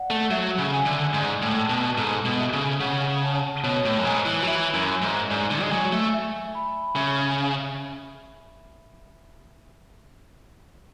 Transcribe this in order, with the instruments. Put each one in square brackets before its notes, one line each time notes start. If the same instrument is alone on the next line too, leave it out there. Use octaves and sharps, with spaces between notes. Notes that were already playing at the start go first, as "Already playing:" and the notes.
Already playing: [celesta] D5 F#5
[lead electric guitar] A3
[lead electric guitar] F#3 [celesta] E5
[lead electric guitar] C#3
[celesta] G#5
[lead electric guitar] D3
[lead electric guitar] G#2 [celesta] D5
[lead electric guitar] A2
[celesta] A5
[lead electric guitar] B2
[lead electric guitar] G#2 [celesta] A4
[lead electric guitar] B2
[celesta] E5
[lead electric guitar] C#3
[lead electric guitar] C#3 [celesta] F#5
[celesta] A5
[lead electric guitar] B2 [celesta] C#5
[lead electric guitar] A2
F#2
[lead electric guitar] G#2 [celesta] G#5
[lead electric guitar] E3
F#3
[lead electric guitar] E3 [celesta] E5
[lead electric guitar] F#2
[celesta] G#5
[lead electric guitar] G#2
[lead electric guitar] G#2 [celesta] D5
[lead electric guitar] D3
G#3
[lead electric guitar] F#3 [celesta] G#5
[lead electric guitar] A3
[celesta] E5
B5
[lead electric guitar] C#3 [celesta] E5